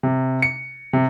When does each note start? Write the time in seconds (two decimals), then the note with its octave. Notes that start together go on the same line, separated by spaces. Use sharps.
0.03 C3
0.42 C#7
0.93 C3